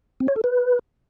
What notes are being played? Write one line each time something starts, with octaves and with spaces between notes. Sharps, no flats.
C4
C#5
A4
B4